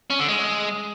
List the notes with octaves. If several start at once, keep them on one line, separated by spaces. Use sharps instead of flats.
C#4
D3
G#3